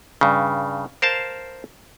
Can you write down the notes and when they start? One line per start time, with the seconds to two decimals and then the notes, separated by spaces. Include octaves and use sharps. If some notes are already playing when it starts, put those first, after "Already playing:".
0.21 G2 C#3
1.02 A#4 C5 F5 A5